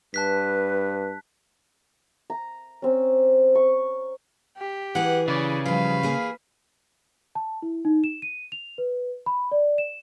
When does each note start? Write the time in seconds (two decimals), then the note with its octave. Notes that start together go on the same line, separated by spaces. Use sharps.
0.14 G2 B4 A5 F#6 B6
2.30 A#5
2.82 C4 C#4
3.55 C#6
4.57 G4
4.95 E3 G#4 F#5
5.28 C#3 B4 D5
5.66 F3 G3 B4 F5
6.03 A#3 G#4
7.35 A5
7.62 E4
7.85 D#4
8.04 E7
8.22 D#7
8.52 F7
8.78 B4
9.26 B5
9.52 D5
9.78 E7